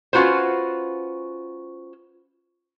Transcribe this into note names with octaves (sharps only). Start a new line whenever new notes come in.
C#4 F4 F#4 B4 C5